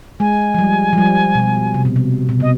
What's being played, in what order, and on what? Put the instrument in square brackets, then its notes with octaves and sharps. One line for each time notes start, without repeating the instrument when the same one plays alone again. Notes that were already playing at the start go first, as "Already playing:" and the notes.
[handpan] G#3 [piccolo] G#5
[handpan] F3
G3
F3
G3
B2
C3
B2
C3
B2
[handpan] C3 [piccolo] D#5